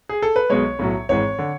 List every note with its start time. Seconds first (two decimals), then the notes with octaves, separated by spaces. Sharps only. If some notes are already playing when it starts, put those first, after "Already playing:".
0.09 G#4
0.22 A4
0.36 B4
0.50 B1 B2 G#3 C#5
0.79 B1 A2 F#3
1.09 G#1 G#2 E3 G#3 C#5
1.39 D3